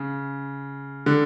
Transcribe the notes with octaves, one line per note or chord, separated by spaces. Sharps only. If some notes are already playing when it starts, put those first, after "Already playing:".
Already playing: C#3
D3